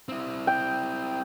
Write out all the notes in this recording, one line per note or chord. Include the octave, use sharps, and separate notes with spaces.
C4 E4
G5